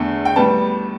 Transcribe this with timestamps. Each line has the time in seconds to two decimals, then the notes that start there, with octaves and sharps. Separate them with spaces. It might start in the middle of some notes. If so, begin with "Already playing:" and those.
Already playing: E2 D3 A3
0.25 G5
0.36 A2 G3 B3 A5